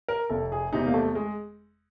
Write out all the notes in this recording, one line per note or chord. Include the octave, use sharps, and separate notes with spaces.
A#4
F1 A4
G#4
E2 C3 D#4
A#3
A3
G#3